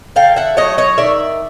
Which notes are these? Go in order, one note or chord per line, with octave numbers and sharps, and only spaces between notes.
D3 F5 G5
E5 F#5
F#3 A3 C#5 D#5
C#5 D#5
D#3 D5 E5